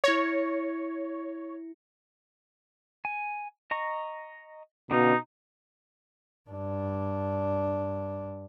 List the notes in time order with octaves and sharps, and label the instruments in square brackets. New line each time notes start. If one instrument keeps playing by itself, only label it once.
[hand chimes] E4 A#6 C#7 [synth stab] C#5
[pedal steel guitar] G#5
D#5 A#5 C#6
[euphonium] B2 [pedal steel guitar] D3 C#4 F5 [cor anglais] D#4
[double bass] G2 D4